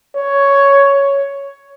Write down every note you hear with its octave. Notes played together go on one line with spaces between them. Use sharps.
C#5